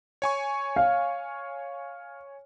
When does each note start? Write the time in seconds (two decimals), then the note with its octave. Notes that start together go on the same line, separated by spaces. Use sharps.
0.22 C#5 G#5 C#6
0.76 F5